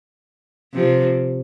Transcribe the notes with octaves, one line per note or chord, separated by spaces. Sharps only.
C3 F3